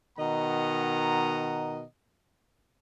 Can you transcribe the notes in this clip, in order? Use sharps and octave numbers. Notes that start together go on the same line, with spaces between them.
B2 D#3 D#5 F#5 A#5